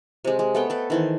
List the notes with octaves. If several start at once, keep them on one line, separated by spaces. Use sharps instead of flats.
C3 G#3
G#3
A3 B3 G5
A4 B4
D#3 E3 C5